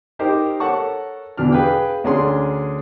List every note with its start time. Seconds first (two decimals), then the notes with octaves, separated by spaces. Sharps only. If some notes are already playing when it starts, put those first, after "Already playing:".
0.19 D#4 G4 A#4 C5
0.60 A4 A#4 C#5 F#5 A5 C#6
1.38 E2 B2 D4 F6
1.52 G#4 B4 F5 G5
2.04 D2 C#4 D4 G#4 C6